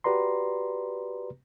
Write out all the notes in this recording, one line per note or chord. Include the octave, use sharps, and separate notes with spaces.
F#4 G4 B4 D5 A#5 C6